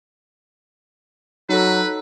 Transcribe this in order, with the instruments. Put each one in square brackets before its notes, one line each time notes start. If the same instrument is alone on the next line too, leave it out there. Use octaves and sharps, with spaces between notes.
[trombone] F#3 [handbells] D#4 A4 [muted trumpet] B4